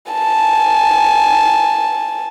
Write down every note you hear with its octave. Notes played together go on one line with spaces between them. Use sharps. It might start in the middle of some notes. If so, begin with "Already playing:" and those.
G#5 A5